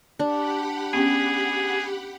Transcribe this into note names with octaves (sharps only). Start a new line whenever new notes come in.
D4 G4 F#5 B5
B3 C#4 G#4 G5